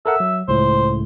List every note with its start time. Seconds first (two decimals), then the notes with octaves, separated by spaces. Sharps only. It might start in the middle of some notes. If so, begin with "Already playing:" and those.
0.06 A4 A#4 E5 F#5
0.20 F#3
0.48 C#2 A2 C5